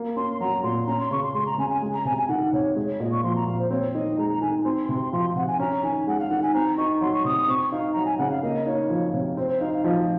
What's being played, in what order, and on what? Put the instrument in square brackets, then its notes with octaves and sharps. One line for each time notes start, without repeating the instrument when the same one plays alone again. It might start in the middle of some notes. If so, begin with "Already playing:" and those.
Already playing: [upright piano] A#3
[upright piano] C#4 [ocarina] C6
[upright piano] F#3 [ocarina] A#5
[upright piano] A#2 [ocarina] C6
[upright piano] C#4 [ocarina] A#5
[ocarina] C6
[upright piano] C#3 [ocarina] C#6
[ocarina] C6
[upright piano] G#3 [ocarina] C6
[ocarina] A#5
[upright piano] C#3 [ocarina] G#5
[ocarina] G#5
[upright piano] G#3
[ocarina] A#5
[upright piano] C3 [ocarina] G#5
[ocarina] G#5
[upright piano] D#3 [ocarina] F#5
[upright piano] C3 [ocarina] C#5
[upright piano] G#3
[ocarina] C#5
[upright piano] A#2 [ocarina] D#5
[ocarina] C#6
[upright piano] F3 [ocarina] C6
[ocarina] A#5
[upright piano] A#2 [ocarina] F5
[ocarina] C5
[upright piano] C4 [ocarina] C#5
[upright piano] D#3 [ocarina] D#5
[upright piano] G#3 [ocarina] A#5
[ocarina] A#5
[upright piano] D#3 [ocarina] G#5
[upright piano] C4 [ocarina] C6
[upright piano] C3 [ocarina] C6
[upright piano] F3 [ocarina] C6
[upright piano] C3 [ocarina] F#5
[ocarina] G#5
[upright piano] C#4 [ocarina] A#5
[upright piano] D#3 [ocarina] G#5
[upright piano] G#3 [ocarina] F#5
[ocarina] F5
[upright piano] D#3 [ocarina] F#5
[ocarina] G#5
[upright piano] C4 [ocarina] A#5
[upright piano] D#4 [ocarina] C#6
[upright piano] F#3 [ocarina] C6
[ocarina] C#6
[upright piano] C3 [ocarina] D#6
[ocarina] D#6
[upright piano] C4 [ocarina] C#6
[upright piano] D#4 [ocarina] F5
[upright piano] F#3 [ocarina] A#5
[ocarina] G#5
[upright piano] C#3 [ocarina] F#5
[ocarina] F5
[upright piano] A#3 [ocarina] D#5
[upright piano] D#4 [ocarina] C#5
[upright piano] F3
C3
[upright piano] C4 [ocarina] C5
[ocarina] C5
[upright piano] D#4 [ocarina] F5
[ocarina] F5
[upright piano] F3 [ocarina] D#5